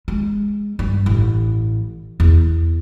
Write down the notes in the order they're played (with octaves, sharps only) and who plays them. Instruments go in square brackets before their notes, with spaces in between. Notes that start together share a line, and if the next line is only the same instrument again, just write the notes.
[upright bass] G#3
G2
A1
E2